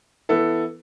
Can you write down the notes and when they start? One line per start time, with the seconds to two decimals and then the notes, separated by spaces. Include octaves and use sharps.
0.29 E3 B3 E4 A4